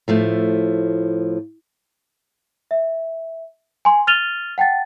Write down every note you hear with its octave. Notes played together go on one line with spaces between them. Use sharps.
A2 F3 A3
E5
G#5 C6
F6 A6 D#7 F7 G7
F#5 G5 A5 A6